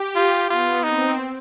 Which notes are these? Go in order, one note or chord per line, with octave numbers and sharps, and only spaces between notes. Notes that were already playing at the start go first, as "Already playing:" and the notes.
Already playing: G4
F4
B3 F4
C4 D#4